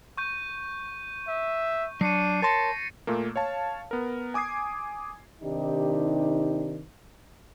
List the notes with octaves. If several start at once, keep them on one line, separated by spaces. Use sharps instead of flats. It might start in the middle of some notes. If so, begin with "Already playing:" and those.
C#6 G6 D#7
E5
F#3 D4 C7 C#7 D#7
A#4 C#5 A5 C6 A6 A#6 C#7
A#2 A3 A#3
C#5 F5 A5
B3 A#4
G#5 D6 D#6 G#6 C7
C3 D#3 D4 D#4 G4